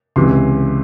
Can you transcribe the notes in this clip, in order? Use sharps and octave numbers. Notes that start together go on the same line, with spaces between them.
C#2 C3 E3 C6